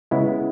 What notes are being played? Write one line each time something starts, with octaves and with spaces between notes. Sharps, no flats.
C#3 G#3 B3 E4